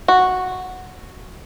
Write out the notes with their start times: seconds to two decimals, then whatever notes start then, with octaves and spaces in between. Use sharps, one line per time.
0.08 F#4